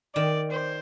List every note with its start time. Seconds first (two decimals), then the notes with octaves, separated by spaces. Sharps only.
0.15 D#3 D5
0.51 C5